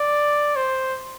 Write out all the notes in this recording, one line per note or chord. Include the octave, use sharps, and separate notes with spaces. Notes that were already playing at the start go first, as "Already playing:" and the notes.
Already playing: D5
C5